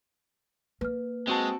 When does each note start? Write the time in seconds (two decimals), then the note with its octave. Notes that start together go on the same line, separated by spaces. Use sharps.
0.81 A#3 B4 F6
1.27 G#3 C4 F#4 A5